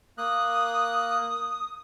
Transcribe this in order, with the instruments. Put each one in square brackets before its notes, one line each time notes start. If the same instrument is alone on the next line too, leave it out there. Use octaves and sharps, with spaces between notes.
[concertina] A#3 F#6 [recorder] D#6